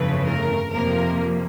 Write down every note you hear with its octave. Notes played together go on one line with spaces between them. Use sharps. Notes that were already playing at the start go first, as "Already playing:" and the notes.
Already playing: G1 F2 C#3 E3 A3 B4
A#4
F2 C3 F3 A#3 A#4